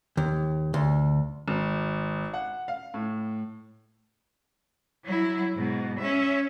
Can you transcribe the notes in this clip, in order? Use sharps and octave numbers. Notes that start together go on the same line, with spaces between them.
D#2
D2
G#1
F#5
F5
A2
F#3 E4
G#2 B2
C#4 E5